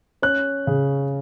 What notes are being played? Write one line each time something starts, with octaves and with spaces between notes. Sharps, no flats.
C#4 F#6
C#3